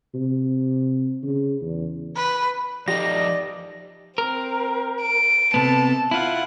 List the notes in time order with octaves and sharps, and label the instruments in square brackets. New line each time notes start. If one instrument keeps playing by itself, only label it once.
[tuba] C3
C#3
E2
[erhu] B4
[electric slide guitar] F3 D#4 [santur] G4 [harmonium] D5 D#5 [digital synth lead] A#6
[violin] C4 [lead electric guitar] A#4
[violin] D7
[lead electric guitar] C3 B3 [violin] A4 A5
[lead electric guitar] E4 F4 [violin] F#5